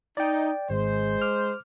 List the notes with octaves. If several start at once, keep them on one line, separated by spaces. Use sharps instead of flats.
D#4 D5 G5
G#1 G#3 C5
D6 F6